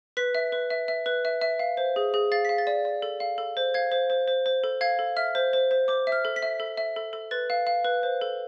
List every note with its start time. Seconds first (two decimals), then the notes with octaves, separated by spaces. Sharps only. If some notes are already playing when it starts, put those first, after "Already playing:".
0.17 B4 B6
0.35 E5
0.52 B4
0.70 E5
0.88 E5
1.06 B4
1.25 E5
1.41 E5
1.59 F5
1.77 C5
1.96 G#4
2.14 G#4
2.32 F5 A6
2.45 F5 B6
2.58 A6
2.67 D5
2.85 D5
3.02 A4
3.20 F5
3.38 A4
3.57 C5
3.74 F5 G#6
3.92 C5
4.10 C5
4.28 C5
4.46 C5
4.64 A4
4.81 F5 G#6
4.99 A4
5.17 E5 F6
5.35 C5
5.53 C5
5.71 C5
5.88 C5 D6
6.07 E5
6.12 F6
6.25 A4
6.36 B6
6.42 E5
6.60 A4
6.77 E5
6.96 A4
7.13 A4
7.31 B4 A6
7.50 F5
7.67 F5
7.85 B4
8.03 C5
8.21 A4